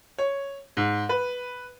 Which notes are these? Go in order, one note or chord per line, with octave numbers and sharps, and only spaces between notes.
C#5
G#2
B4